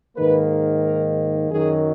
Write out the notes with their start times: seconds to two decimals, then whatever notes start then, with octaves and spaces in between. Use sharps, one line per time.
0.17 G#2 D#3 A#3 B4
0.83 A#4
1.49 F#2 D#3 F#3 G#4